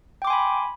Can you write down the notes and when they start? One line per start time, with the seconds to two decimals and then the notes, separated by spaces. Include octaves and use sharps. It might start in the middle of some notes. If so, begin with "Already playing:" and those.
0.22 G5
0.25 D6
0.27 C6
0.30 G#5
0.33 B5